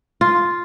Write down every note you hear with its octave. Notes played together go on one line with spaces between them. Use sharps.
F4